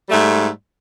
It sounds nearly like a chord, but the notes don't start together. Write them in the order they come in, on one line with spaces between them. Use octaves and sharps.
G3 A3 G#2